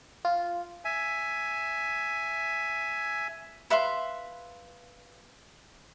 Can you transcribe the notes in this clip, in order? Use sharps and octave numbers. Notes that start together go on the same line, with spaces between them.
F4
E5 G#5
B4 E5 F5 C6